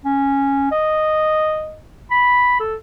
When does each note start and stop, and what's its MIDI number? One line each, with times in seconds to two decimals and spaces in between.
0.05 0.68 61
0.71 1.78 75
2.11 2.60 83
2.60 2.75 69